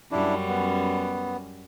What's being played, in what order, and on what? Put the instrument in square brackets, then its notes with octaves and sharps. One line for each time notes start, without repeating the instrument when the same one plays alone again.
[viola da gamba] F#2 G3 C#4 [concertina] D4 E4
[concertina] B3